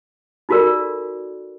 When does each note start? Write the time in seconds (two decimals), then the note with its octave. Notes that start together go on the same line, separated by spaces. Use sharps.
0.49 D#4 F4 F#4 A4 A#4 D5